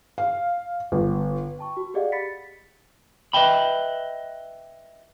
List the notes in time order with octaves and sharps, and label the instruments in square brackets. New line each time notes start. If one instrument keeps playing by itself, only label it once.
[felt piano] F5
G1
[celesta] G5 A5 C#6
F#4
G4 G#4 D5 D#5 F5 F#5
B5 A6 B6 C#7
[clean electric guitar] B4 D#5 E5 G5 B5